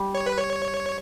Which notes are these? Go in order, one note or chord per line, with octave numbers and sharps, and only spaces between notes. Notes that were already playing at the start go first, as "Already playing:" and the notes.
Already playing: G3
C#5
B4
C#5